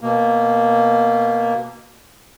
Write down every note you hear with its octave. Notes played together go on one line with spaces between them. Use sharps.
B2 A#3